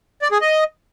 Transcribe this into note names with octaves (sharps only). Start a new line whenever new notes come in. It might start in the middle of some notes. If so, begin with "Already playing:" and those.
D5
G#4
D#5